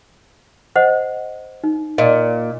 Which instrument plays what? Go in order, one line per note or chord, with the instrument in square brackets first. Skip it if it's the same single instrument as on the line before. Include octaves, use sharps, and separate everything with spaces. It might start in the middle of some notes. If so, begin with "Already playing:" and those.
[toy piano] C5 D#5 F#5
D#4
[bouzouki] A#2 [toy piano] D#5